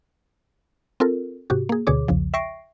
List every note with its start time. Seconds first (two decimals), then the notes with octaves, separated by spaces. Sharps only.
1.00 C4 F4 A4 A#4
1.50 G#2 C3 F#4 G4
1.69 A#3 G#4
1.87 D2 B2 D3 G#4 C#5 D6
2.08 B1 E2 C#3 F3
2.34 E5 G5 C#6 A#6 C7 D7